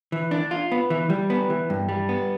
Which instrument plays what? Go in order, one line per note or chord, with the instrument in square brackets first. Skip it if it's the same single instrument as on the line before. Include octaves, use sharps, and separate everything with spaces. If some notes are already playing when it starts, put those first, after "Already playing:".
[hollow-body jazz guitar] E3
D4
F4
B3
E3
G3
B3
E3
G2
G3
B3